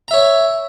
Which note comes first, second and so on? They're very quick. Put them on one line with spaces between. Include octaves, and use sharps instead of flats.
A#5 E5 C#5